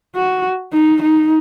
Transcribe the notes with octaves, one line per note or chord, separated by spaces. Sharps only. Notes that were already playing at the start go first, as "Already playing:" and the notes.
F#4
D#4
D#4